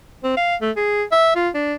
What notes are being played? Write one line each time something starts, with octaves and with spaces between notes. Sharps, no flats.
C4
F5
A3
G#4
E5
F4
D4